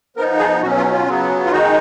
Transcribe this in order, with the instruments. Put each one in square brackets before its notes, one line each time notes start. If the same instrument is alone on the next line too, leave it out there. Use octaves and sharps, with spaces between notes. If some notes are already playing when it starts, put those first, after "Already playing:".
[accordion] F3 B3 D#4 A#4
G#4
B2 F#3 C#4 F#4
F4
F4
C#3 F#3 B3
F4
D#3 G#3 D#4 F#4